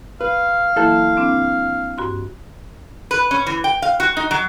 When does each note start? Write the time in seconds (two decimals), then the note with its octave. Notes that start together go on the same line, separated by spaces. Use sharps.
0.21 B4 F5
0.76 E3 F#3 A#3 E4 A4
1.17 C4 D4
1.98 G2 F#4 C6
3.11 B4
3.31 C#4
3.47 E3
3.64 G5
3.82 F5
4.00 F#4
4.17 D#4
4.31 F#3